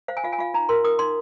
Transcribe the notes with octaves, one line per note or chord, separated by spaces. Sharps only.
C5 F5
G#5
F4 F5
G#5
F4 F5
D#4 A#5
A#4 C6
A#4 D#6
D#4 C6